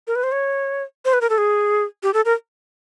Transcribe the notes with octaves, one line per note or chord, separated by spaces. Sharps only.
A#4
B4
C5
C#5
C5
B4
A#4
A4
G#4
G4
A4
A#4